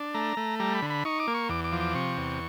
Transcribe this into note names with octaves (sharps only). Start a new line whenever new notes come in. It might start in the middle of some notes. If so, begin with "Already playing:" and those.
Already playing: D4
A3 A#5
A3
G3 A#5
B5
D3
B5
D#4 C#6
D6
A#3
C#6
E2 D6
D6
F3
D6
C3 C#6
E2